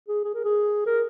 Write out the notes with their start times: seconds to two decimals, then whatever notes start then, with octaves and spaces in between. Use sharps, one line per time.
0.09 G#4
0.24 G#4
0.35 A#4
0.45 G#4
0.86 A#4